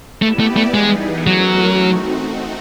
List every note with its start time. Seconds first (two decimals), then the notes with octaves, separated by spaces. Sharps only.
0.22 A3 B3 E4 G4 B4 D5
0.40 A3
0.56 A3
0.74 E3 G3 G#3 B3 D#4 G#4
1.26 E3 F#3 A3 C#4 F#4 A#4
1.79 A3 C4 D#4 F#4